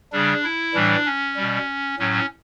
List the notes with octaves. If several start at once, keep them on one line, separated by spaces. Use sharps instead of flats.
C#3 G3 D4
E4
A2 E3 G3 D4
C#4
B2 G3
A2 F#3 C#4